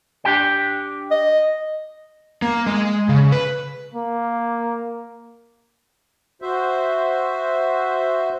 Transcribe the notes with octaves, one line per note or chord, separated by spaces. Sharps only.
D4 G4 G5
D#5
A#3
G#3
C#3
B4
A#3
F#4 C5 E5